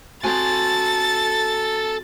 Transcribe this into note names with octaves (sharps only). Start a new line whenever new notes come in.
C4 F#4 A4 G#5 A5 A6